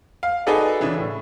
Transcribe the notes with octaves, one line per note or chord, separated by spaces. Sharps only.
F5
D#4 F#4 G#4 A4 B4 D5
C#3 E3 D4
A2